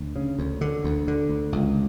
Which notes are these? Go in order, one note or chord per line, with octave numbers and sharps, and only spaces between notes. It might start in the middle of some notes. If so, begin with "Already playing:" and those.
Already playing: D2
C#3
D2
D3
D2
D3
D2
C#2